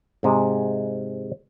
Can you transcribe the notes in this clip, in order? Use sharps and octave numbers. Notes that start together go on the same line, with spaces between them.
G#2 C3 G#3